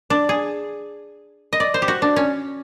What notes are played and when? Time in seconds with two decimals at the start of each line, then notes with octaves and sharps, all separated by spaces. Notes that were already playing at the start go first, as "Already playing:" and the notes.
0.10 D4
0.29 G#4
1.53 D#5
1.60 D5
1.74 C5
1.82 G4
1.88 F#4
2.02 D4
2.16 C#4